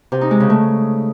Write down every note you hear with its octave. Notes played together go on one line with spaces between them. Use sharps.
C3
D#4
G#3
C#3
A3